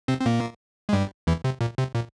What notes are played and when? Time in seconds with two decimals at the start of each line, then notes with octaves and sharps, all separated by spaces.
0.08 C3 C4
0.20 C4
0.26 A#2 A#3
0.89 G#3
0.93 G2 G3
1.27 E2 E3
1.44 C3
1.61 A#2
1.78 C3
1.95 A#2